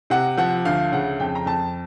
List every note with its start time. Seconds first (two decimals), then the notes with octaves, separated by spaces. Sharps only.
0.10 C3 F#5
0.37 F3 F#5
0.65 D2 F5
0.92 C#3 F#5
1.20 F2 G5
1.35 A#5
1.46 F2 A5